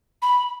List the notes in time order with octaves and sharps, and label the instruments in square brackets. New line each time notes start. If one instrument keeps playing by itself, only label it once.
[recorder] B5